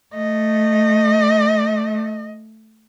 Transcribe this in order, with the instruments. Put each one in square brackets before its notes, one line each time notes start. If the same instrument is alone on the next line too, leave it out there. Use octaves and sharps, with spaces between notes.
[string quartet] A3 [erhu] D#5